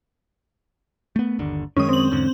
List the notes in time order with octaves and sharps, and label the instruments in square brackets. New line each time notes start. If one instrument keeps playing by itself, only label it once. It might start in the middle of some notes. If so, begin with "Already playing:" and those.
[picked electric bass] A3 B3
G1 D#2 D3
[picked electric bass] F#2 D#3 G#3 [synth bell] C#4 D#6
[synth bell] C4 F#7
[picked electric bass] E2 G#2 D3